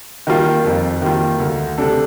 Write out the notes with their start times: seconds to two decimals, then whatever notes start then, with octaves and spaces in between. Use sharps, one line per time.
0.27 D#3 G3 A#3 F4
0.64 F2
1.02 D#3 G3 A#3 F4
1.40 D2
1.78 C3 G3 D4 A4